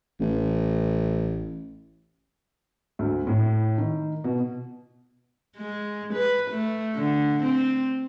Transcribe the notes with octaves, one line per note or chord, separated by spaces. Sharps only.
A1
D2
A2
D#3
B2
G#3
B4
A3
D3
C4